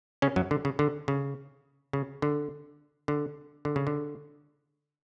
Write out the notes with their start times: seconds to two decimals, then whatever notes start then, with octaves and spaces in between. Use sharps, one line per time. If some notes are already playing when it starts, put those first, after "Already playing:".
0.22 C#3 C#4
0.36 F#2 F#3
0.51 D3
0.65 C#3
0.79 D3
1.08 C#3
1.93 C#3
2.22 D3
3.08 D3
3.65 D3
3.76 C#3
3.87 D3